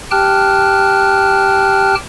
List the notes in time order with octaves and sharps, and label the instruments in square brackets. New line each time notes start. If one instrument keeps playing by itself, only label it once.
[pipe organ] G4 G5 A5 F6 F#6